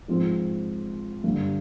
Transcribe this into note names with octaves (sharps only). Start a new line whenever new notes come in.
G#2 F3 C4 F4
G2 D3 G3